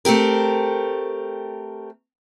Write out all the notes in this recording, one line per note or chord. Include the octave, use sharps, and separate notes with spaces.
A3 C4 G4 A#4